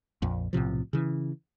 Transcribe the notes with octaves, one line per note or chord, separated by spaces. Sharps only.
A#1 F2
B1 A2 C3 F3
C#3 E3